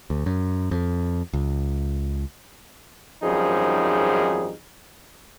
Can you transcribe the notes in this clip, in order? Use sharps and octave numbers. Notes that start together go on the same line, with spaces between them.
D2
F#2
F2
C#2
G#1 F#2 F3 G3 D#4 G#4